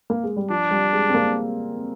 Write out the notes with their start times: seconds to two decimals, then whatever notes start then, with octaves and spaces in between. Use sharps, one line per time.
0.10 A#3
0.24 G#3
0.36 G3
0.50 F3 D4
0.71 G3
0.93 G#3
1.09 C4
1.14 A#3